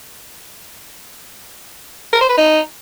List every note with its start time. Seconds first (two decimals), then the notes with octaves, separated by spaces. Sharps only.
2.13 A#4
2.21 C5
2.29 B4
2.37 D#4